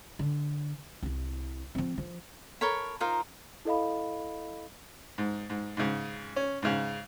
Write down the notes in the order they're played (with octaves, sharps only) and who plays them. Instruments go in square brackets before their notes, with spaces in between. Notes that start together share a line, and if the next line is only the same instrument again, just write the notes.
[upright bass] D3
C2 E4
F3 C4
F3
[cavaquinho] A4 A#4 C#5 B5
D#4 F4 A#4 C5
[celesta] E4 A4 D#5 F5 B5
[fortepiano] G#2
G#2
G#2 C#3
C#4
G#2 C#3